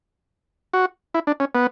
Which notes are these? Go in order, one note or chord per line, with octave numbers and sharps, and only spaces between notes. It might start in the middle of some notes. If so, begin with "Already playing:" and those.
F#4
E4
D4
C#4
B3